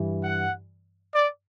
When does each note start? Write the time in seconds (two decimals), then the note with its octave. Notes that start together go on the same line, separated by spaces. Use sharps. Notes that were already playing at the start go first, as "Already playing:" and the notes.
Already playing: G2 E3 G3
0.24 F#5
1.15 D5